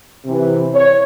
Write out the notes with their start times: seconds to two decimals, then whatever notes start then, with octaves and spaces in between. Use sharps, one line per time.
0.24 C3 E3
0.74 C#5